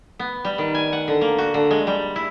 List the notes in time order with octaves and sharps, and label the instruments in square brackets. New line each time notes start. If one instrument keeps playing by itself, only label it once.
[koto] B3
G3
D#3
G#5
F#5
D3
A#3
F#4
D3
G#3
G3
E4